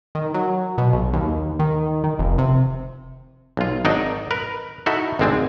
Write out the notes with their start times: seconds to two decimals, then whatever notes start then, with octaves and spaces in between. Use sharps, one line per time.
0.15 D#3
0.34 F#3
0.78 B2
0.93 B1
1.13 D#2
1.59 D#3
2.04 D#3
2.19 F1
2.38 C3
3.57 B1 F4
3.85 G#1 F#3 D4 D#4 D5 D#5
4.31 A#4 B4
4.86 D#4 E4 F#4 A4 E5
5.19 G#1 D2 G#3 C4 D4 G#5